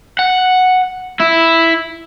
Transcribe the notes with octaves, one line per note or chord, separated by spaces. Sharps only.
F#5
E4